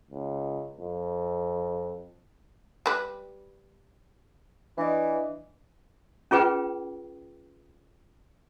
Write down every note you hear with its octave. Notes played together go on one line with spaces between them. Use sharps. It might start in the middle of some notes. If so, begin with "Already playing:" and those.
C#2
F2
G3 B4
E3 D4 B4 D5 D#5
C#4 F4 G#4 B4 G5